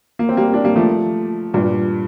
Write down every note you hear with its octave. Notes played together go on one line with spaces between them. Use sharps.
A#3
C4
G3 A#3
A#3 D4
G3 A#3
F3 A3
G2 A#2